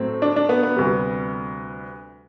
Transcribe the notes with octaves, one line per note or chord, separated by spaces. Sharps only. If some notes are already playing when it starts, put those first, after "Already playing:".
Already playing: A2 F#3 A3 C4
D4
D4
B3
B3
D2 C3 G3